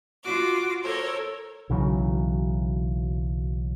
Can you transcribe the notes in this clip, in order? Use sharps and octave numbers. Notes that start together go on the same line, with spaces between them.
F4 F#4 D6
A4 A#4 C5 C#5
B1 C#3 E3 F#3